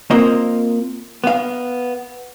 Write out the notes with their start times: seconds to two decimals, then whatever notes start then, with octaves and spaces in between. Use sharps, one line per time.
0.10 A#3 C4 F4 A#4 C5 D#5
1.24 B3 F5